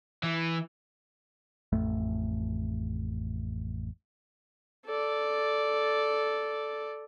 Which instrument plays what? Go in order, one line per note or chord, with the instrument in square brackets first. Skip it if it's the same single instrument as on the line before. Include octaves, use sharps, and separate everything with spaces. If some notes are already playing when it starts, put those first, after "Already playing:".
[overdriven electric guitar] E3
[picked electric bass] A1 F2 A3
[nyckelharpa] A4 D5